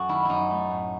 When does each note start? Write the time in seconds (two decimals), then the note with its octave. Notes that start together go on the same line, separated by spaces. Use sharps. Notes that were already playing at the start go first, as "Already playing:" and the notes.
Already playing: F#2 F#4 A4
0.09 D#3 E4
0.25 F#2 D#4 E4
0.50 A3
0.70 A2